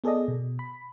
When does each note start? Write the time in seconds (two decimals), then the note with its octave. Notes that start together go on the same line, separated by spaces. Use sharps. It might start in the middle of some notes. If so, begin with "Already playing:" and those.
0.04 B3 G#4 A4 D5 D#5
0.28 B2
0.59 B5